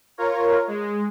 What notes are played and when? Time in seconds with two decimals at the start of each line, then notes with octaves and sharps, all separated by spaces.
0.18 F4 A#4 C#5
0.68 G#3